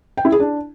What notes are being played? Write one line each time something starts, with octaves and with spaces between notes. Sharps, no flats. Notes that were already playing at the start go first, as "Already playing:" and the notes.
G5
E4
G#4
D4